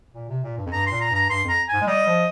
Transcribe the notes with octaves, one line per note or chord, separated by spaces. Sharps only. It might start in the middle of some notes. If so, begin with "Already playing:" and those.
A#2
C3
A#2
G2
F2
G2 A#5
A#2 C6
A#5
G2
A#5
G2 C6
F2 A#5
G#2 G#5
G#3
G3 D#5
F3